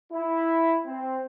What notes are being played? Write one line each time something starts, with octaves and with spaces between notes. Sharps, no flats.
E4
C4